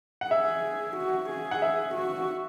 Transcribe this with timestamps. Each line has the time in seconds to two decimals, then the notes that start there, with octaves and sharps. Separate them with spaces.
0.21 F#5
0.30 G#4 E5
0.97 F#4
1.29 G#4
1.51 F#5
1.62 E5
1.95 F#4